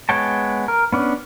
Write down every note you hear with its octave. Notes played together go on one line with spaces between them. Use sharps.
G#3 B3 C#5 G5 A5
A#4
B3 C#4 D4